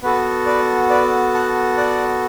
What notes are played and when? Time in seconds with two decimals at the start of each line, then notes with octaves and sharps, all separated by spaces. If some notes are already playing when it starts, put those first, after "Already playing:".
0.03 B3 F#4 A4 B4
0.46 B4 D5
0.90 B4 D5
1.34 F#5 A5
1.77 D5 F#5